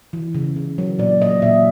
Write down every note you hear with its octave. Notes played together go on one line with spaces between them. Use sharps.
E3
C#3
C#3
F#3
A#2 D5
A#2 D#5
A#2 E5